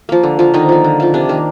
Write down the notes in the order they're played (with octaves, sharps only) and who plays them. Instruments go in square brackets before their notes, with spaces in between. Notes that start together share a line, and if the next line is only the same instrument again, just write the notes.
[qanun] F3 A#3
D3
F3 A#3
D3 D#3 D#4
F3 A#3
D3
F3 A#3
C3 D4
D#3 A#3